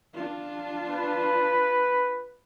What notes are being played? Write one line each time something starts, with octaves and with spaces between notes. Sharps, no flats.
D4 F4
B4